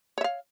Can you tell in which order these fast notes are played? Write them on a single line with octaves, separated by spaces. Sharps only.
C#5 E5 F5